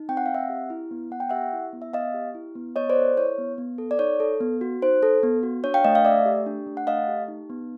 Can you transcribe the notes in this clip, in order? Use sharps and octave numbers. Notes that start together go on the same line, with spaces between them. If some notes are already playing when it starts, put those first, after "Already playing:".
Already playing: D#4
C4 G5
F#5
C4 F5
E5 F#5
G4
E4
B3
B3 F#5
G5
G4 E5 F#5
E4
B3
E5
B3 D#5 F5
G4
E4
B3
B3 C#5 D#5
C5 D5
A4
E4 C#5
B3
B3
A4
D5
D#4 C#5
A4
B3
F#4
D#4 C5
A4
B3
F#4
D4 C#5
F5 G5
A3 D#5 F5
D#5 F5
A3 D5 E5
G4
D4
A3
F#5
A3 D#5 F5
G4
D#4
B3